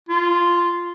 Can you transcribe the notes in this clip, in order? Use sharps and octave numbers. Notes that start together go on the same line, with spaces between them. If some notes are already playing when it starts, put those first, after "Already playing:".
F4